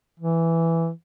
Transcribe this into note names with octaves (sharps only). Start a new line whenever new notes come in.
E3